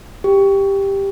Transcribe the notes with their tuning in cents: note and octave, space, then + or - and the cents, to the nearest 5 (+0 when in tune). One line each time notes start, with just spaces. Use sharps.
G4 +5